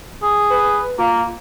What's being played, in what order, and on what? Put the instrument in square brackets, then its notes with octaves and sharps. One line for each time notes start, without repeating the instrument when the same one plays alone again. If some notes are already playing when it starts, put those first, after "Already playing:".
[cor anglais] G#4
[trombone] B4
[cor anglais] A#3 [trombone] F4